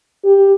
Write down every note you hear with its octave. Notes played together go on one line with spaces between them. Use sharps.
G4